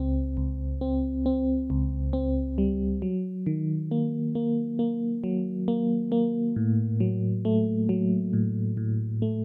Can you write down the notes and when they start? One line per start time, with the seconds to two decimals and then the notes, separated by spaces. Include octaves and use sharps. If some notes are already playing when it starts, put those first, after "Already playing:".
Already playing: C#2 C4
0.37 C#2
0.81 C4
1.26 C4
1.70 C#2
2.13 C4
2.58 G3
3.02 F#3
3.46 D#3
3.91 A#3
4.35 A#3
4.79 A#3
5.24 F#3
5.68 A#3
6.12 A#3
6.56 A2
7.00 F#3
7.45 A3
7.89 F#3
8.33 A2
8.77 A2
9.22 A3